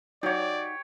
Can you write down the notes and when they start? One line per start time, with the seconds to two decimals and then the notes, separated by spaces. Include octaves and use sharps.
0.23 F#3 D#4 G4 C#5 D5 F#5